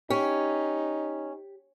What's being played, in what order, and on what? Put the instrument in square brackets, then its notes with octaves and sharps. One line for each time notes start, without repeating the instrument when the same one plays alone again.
[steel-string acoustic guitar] C#4 [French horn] D#4 [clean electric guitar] G4